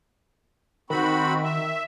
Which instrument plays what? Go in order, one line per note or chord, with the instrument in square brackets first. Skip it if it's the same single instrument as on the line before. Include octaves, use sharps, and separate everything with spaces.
[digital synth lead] D#3 [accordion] C4 F#4 B5
[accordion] E5